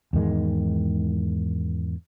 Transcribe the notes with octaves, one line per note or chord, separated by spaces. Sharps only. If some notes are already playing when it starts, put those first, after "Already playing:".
E2 G#2 D#3 G#3